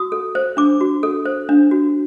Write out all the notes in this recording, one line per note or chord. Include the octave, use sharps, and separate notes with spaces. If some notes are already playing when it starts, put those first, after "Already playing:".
Already playing: F#4 D#6
A4
C5
D4 D6
F#4
A4
C5
D4
F#4